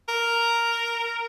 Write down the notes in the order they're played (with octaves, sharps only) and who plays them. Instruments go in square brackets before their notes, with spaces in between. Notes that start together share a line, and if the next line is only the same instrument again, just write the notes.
[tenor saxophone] A#4